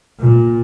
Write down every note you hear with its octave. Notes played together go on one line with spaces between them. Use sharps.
A#2